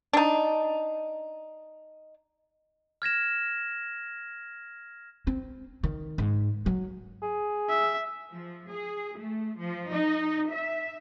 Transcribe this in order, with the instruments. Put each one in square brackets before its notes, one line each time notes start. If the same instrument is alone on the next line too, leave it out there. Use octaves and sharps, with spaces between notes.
[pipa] D4 D#4
[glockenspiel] F6 G#6 A#6 E7
[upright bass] C4
D#3
G#2
F#3
[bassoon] G#4
[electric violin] E5
[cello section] F3
G#4
A3
F3
D#4
E5